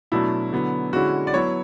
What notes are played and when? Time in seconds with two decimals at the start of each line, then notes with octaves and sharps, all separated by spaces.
0.12 B2 F#3 A3 D4 E4
0.52 D3 F#3 B3 E4
0.93 D3 G#3 C#4 E4 F#4
1.27 D5
1.34 F#3 B3 E4 C#5